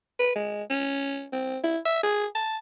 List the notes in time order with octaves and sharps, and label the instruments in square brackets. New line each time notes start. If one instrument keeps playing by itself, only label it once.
[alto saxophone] B4
G#3
C#4
C4
E4
E5
G#4
A5